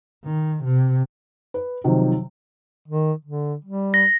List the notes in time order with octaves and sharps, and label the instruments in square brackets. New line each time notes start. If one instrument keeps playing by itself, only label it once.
[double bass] D#3
C3
[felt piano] B4
C3 D#3 F3 F#3
[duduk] D#3
D3
G3
[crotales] A#6